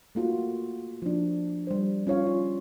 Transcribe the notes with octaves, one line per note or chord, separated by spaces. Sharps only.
A3 A#3 F4 F#4
F3 D4
G3 C5
C#4 F4 C#5 F5
F4